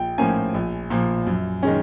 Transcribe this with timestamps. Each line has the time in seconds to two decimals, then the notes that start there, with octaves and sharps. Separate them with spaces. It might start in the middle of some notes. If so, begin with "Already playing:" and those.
Already playing: A#1 G5
0.18 A2 F3 A#3 C#4 G#5
0.54 A#1
0.90 A#2 F3
1.27 F#2
1.63 D#3 G#3 C#4